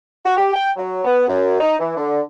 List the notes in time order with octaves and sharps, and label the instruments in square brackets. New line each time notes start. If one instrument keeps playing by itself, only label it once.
[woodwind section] F#4
G4
G5
F#3
B3
F#2
D#4
E3
D3